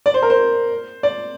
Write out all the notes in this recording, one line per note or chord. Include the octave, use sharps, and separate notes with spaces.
D5
C5
A#4
C5
D5